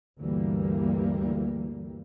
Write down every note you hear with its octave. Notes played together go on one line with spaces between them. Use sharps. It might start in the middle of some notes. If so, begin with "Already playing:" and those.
D2 G2 E3 G3 A#3